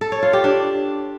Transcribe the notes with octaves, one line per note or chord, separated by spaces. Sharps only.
A4
C#5
F4
G4
D4